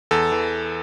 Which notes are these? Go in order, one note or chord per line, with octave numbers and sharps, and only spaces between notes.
E2 A4
E3